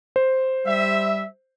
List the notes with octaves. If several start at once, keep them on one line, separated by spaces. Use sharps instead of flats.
C5
G3 E5